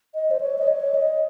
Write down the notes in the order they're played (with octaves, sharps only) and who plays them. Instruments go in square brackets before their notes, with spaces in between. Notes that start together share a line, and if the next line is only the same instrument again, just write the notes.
[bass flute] D#5
C5
C#5
D#5
C#5
D#5